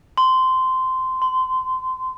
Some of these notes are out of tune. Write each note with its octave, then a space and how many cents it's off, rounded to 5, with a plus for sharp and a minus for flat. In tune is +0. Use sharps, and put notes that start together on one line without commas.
C6 -15
C6 -25